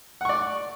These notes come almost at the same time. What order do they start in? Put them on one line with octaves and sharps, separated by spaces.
F#5 C#6 D5